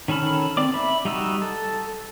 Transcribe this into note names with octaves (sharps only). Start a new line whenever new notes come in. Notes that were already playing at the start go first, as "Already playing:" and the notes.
D#3 C#4 A4 B5 F6
C4 D5 D6
E5 B5
G3 D#4 F#4 E6
A4